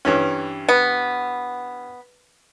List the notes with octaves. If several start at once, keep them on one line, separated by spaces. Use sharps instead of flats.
G2 E3 C#4
B3